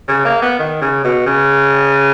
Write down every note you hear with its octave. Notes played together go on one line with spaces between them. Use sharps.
C#3
A#3
B3
D#3
C#3
B2
C#3